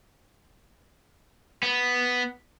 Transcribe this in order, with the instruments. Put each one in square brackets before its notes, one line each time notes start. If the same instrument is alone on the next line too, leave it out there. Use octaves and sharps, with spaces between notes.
[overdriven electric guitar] B3